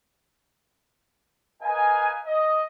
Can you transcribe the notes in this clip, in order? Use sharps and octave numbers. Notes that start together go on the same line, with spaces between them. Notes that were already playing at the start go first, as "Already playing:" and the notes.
A#4 B4 D#5 F5 G#5
D#5